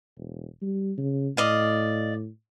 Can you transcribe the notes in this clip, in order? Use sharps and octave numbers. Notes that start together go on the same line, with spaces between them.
E1
G3
C#3
A2 D5 D#5 F5